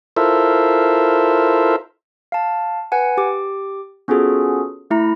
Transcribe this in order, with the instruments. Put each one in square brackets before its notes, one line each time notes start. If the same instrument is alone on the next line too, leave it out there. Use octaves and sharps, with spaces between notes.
[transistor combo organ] E4 F4 A4 A#4 C5 E5
[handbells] F5 A5
B4 F#5 G#5
G4 D6
B3 C#4 F4 F#4 G#4 A4
A3 E4 A#5